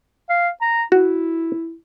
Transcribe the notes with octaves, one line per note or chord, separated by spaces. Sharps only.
F5
A#5
E4 F#4